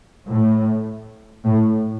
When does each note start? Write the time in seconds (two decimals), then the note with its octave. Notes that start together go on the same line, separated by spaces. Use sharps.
0.29 A2
1.45 A2